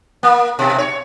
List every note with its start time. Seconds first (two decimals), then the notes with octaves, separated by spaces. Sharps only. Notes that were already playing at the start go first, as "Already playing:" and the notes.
0.23 A#3
0.59 B2
0.78 C#5